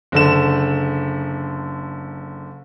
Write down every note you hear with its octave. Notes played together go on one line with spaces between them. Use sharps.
F#1 D3 E7